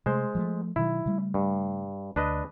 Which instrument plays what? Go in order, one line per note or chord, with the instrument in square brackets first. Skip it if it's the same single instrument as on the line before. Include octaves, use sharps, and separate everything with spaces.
[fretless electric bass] C3 A3 [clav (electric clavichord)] G#3 C5
[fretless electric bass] F3 G3 A3
[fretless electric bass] B2 D#3 F#3 [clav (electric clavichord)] E4
[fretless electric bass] C#3 G3 A3
[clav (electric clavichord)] G2
[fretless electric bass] D2 [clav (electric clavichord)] D4 B4 D#5